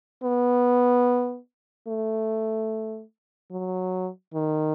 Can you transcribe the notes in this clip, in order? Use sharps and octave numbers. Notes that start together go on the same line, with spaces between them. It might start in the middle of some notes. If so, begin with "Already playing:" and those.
B3
A3
F#3
D#3